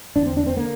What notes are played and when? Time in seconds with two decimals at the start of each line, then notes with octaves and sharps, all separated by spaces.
0.16 E2 D3 D4
0.26 C4
0.37 D4
0.47 C4
0.57 D3 A#3